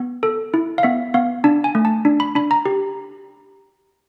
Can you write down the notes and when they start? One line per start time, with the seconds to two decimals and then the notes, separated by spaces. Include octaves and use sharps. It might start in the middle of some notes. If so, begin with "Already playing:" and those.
Already playing: B3
0.23 A4
0.54 E4
0.78 F5
0.83 B3 E5
1.14 B3 F5
1.44 D4 A5
1.64 G#5
1.75 A3
1.85 A5
2.05 D4
2.20 B5
2.35 D4 B5
2.51 A#5
2.66 G4